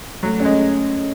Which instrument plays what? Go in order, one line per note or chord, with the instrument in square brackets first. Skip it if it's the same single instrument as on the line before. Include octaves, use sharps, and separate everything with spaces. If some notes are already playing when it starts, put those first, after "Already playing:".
[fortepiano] F#3 [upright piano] A3
[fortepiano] G#3 [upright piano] C#4